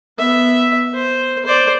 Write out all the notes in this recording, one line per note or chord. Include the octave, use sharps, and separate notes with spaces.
B3 E5
C5
C5 D5